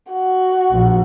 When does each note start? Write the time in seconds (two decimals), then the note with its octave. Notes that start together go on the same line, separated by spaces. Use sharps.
0.12 F#4
0.71 A#1